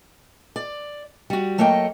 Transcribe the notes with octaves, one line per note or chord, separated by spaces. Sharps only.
D5
G3 F#4
F#3 A3 A#3 C#5 D#5 G5